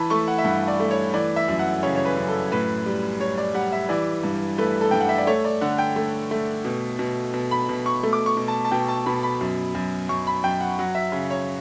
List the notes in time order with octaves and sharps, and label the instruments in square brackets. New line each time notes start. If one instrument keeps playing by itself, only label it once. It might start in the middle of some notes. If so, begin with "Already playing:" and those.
Already playing: [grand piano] E3 A5 B5
A3 C#6
F#5
E5
G2 F#5
D5
A3
C#5
E3 D5
E5
F#2
F#5
C#3 C#5
C#5
B4
F#2
A4
A2 B4
G3
G3 C#5
D5
G3 F#5
E5
E3 D5
G2
A3 B4
A4
G2 G5
F#5
E5
D5
A3 C#5
D5
D3 F#5
G5
A3
A3
B2
B2
B2
B5
B2
C#6
A3
D6
C#6
B2
A5
A5
B2 G5
A5
B2 B5
B5
F#2
F#2
F#2 C#6
B5
F#2 G5
F#5
F#3 F#5
E5
C#3
C#5